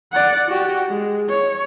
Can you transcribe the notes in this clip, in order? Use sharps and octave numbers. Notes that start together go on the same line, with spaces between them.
D5 F#5
F#4 G4
G#3
C#5